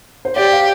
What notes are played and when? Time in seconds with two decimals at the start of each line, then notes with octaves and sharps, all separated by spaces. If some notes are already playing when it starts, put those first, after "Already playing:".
0.25 C5
0.36 G4 D5
0.52 F5